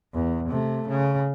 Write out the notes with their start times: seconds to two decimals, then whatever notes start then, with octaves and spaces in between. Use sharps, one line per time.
0.14 E2
0.49 C3 A3
0.88 C#3